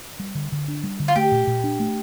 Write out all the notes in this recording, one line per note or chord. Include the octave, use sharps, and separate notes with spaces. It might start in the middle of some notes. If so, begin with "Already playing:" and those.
G3
D3
D3
D4
G3
D3
F4
A3 G4
A#2
A#2
D4
A3